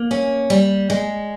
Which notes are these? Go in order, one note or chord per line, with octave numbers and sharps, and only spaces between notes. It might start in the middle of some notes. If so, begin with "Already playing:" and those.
Already playing: A#3
C#4
G3
G#3